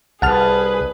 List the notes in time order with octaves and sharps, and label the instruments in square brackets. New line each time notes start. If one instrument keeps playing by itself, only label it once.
[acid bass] C2 [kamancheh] G#4 B4 [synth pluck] F#5 A5 F6